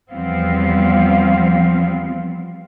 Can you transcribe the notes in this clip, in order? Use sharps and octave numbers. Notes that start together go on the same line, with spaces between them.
E2 F3 G3 B3 C4 F5